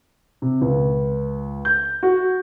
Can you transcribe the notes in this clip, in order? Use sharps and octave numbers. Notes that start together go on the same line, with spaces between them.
C3
C#2
G6
F#4